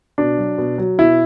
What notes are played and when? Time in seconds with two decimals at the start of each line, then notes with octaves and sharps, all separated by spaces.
0.18 B2 D4
0.38 F#3
0.58 B2
0.78 F#3
0.98 B2 E4